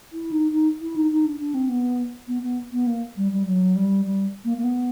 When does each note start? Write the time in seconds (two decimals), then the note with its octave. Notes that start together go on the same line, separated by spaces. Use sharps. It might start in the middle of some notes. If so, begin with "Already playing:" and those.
0.13 E4
0.32 D#4
0.52 D#4
0.81 E4
0.96 D#4
1.11 D#4
1.25 D4
1.40 D4
1.54 C4
1.69 B3
2.28 B3
2.43 B3
2.72 B3
2.87 A#3
3.17 G3
3.32 G3
3.46 F#3
3.76 G3
4.05 G3
4.45 A#3
4.58 A#3
4.64 B3